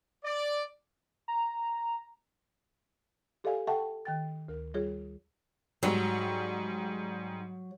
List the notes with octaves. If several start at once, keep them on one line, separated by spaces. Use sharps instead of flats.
D5
A#5
G4 A4 D5 E5 F5 G#5
A4 E5 F#5 G5 A5 C#6
D#3 G5 A6
D2 A#4
G3 F4 G#4 C#5
G#2 F#3 G3